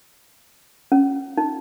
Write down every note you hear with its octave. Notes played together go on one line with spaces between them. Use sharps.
C#4
D#4